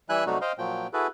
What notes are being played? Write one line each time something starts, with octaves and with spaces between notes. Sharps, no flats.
E3 G3 E4 E5 G#5 F#6
C3 F#3 G3 A3 D#4 F#4
C5 D#5 F5 G5
A#2 F3 F#3 G5
E4 F#4 G#4 A4 B4